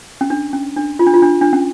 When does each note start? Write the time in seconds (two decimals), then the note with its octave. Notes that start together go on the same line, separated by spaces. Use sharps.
0.21 C#4
0.30 D4
0.53 C#4
0.77 D4
0.99 F4
1.07 D4
1.14 F4
1.22 D4
1.41 D4
1.53 C#4